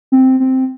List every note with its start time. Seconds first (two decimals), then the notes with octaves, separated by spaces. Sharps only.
0.12 C4
0.40 C4